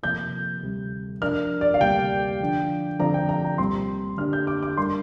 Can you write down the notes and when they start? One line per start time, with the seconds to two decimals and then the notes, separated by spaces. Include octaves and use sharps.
0.03 C3 F3 A#3 G6
0.62 D2 C3 G3
1.21 F3 D4 A#4 D5 F6
1.61 D5
1.74 F5
1.81 D2 C3 G3 A#3 G4 G5
2.40 D3 F3 D4
2.99 D3 F3 C4 F4 D5 A#5
3.14 G5
3.29 A#5
3.45 A#5
3.58 C2 A#2 G3 C4 C6
4.18 D3 A#3 D4 G4 F6
4.33 G6
4.47 D6
4.63 D6
4.77 G3 D4 A#4 C6